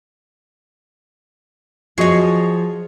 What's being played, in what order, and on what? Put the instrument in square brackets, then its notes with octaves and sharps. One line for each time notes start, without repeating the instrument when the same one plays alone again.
[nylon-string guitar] F3 [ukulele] F#4 D#5 [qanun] G#4 C#5